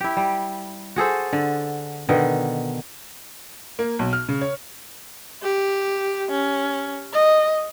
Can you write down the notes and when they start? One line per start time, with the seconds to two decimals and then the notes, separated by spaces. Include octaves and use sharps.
0.01 E4 G4
0.17 G3
0.96 F#4 G#4 A4 C5
1.33 D3
2.09 B2 D3 D#3 D#5
3.79 A#3
3.99 B1
4.13 F6
4.29 C#3
4.41 C#5
5.43 G4
6.31 C#4
7.13 D#5